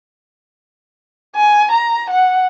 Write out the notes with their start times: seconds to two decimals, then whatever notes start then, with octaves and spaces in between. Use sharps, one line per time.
1.36 G#5
1.72 A#5
2.10 F#5